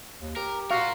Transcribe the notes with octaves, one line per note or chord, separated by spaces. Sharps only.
D#2
G4 A#4
F4 F#4 A#4 F5